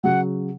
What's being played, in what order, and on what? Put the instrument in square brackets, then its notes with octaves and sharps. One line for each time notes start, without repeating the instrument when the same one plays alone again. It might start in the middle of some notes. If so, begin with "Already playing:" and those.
[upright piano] C#3 F#3 [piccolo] F#5